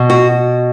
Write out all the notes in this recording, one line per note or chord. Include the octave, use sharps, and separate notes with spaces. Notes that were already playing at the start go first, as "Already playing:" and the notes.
Already playing: B2
F#4